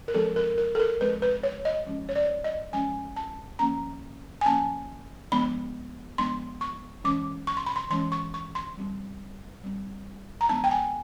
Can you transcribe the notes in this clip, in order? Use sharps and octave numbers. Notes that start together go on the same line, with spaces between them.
A#4
F3 G#3 C4 A4
A#4
A#4
A4
A#4
F3 G#3 C4 B4
B4
C#5
D#5
F3 G#3 C#4
C#5
D5
D#5
F3 G#3 C#4 G#5
A5
F3 A#3 C#4 A#5
G#5
F3 A#3 C#4 A5
F3 G#3 B3 D4 B5
F3 G#3 B3 D4 C6
C#6
E3 G#3 C#4 D6
C#6
C6
B5
C6
E3 G#3 C#4 C6
C#6
C#6
C6
G3 C4
G3 C4
A#5
F3 G#3 B3 D4 A5
G5
G#5